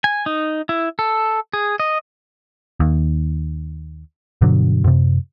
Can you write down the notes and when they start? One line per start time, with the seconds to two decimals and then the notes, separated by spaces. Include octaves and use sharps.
0.04 G#5
0.26 D#4
0.69 E4
0.99 A4
1.53 G#4
1.80 D#5
2.80 D#2
4.41 G2 B2 D3 F#3
4.84 F#2 C3